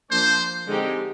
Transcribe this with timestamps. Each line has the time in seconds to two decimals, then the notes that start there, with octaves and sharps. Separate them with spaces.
0.11 F3 A#3 D4 C5
0.67 D3 G#3 C4 D#4 G4